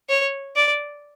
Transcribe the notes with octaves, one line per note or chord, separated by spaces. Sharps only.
C#5
D5